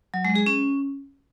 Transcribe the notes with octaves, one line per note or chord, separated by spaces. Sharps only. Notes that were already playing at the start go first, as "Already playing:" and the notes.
F#3
G#3
G#4
C#4